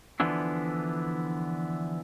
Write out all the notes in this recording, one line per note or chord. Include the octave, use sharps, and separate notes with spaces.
D3 E3 F3 B3 D4 E4